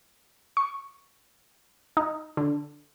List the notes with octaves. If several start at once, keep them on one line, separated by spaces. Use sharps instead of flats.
C#6
D#4
D3